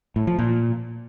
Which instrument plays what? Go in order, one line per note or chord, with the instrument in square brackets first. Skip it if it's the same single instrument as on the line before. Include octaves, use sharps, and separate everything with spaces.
[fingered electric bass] A2
F3
A#2